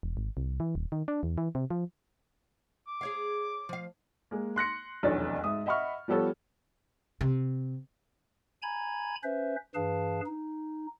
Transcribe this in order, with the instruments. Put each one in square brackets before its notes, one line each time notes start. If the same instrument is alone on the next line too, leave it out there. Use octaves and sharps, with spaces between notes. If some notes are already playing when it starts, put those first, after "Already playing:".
[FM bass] E1
G#1
C2
E3
D#1
D#3
D4
E2
E3
C3
F3
[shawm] D6
[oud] G#4 C#5 F5
F3 F5
[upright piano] G#3 A#3
C6 F#6 A#6 C#7
F1 B1 E2 D4 C#5 A6
G#2 E5 D#6
D#5 E5 F#5 B5 C#6 F6
F3 G3 B3 A4 C#5
[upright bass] C3
[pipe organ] G#5 A#5 B5 G#6
C#4 B4 C5 E5
G2 E3 G#4 B4 F5 A5
D#4